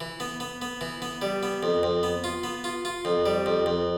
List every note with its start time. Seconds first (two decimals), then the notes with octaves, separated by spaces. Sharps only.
0.01 E3
0.20 B3
0.40 B3
0.62 B3
0.81 E3
1.02 B3
1.22 G3
1.43 B3
1.63 F2
1.83 F2
2.03 B3
2.24 F4
2.44 B3
2.64 F4
2.85 F4
3.05 F2
3.26 G3
3.46 F2
3.66 F2